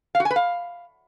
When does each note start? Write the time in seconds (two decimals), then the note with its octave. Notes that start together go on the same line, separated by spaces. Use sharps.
0.15 F5
0.20 F#4
0.25 G#5
0.31 B4
0.36 F5